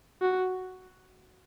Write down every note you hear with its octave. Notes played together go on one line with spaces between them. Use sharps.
F#4